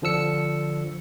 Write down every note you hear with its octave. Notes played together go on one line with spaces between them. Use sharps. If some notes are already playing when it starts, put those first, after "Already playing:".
D3 F3 D4 E6 C#7